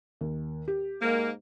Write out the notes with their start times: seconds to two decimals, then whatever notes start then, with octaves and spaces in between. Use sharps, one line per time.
0.21 D#2
0.68 G4
1.02 G#2 A#3